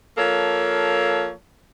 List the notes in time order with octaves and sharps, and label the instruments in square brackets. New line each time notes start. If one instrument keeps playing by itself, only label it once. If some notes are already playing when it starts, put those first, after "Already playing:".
[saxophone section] F3 A#3 A4 C#5